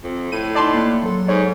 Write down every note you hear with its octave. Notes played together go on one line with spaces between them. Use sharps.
F2
A2 D#7
D#4 D5 D#5 A5 C6 C7
A#3 F#6
F#3 A4 C6
G#2 C#5